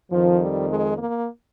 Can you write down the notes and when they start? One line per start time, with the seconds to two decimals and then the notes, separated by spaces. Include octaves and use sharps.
0.10 F2 D#3 F3
0.40 G3
0.68 G#3
0.97 A#3